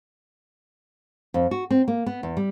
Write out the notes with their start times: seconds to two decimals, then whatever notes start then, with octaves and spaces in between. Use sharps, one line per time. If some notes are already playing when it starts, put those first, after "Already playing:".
1.34 F2
1.51 F#4
1.71 C4
1.88 A#3
2.06 B3
2.23 E2
2.37 G3